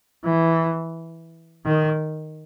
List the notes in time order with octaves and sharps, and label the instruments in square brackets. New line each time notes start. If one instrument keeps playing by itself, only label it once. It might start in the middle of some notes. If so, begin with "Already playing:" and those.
[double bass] E3
D#3